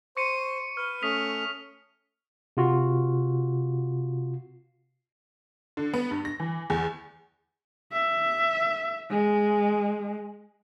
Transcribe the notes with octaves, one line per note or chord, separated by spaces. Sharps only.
C5 C#6 C#7 D#7
B4 F6
A3 C#4 D#6 B6 F7
C3 F4 F#4
D3
B3
G2
A#6
E3
E2
E5
G#3